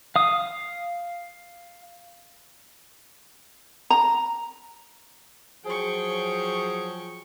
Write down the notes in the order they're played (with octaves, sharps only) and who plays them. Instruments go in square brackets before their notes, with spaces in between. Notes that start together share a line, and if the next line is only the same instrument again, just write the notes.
[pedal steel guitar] F5 D#6
[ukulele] A#5
[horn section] F3 F#3 G#4 [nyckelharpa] G5 C#6